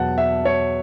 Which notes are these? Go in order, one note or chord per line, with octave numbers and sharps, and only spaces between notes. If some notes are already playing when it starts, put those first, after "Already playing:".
Already playing: E2 B2 F#3 F#5 A5
E5
C#5